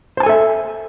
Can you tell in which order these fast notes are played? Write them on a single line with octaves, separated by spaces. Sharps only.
C5 A5 G#5 A4 E5